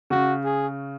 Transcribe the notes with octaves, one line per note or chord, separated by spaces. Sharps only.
C#3 F#4
G#4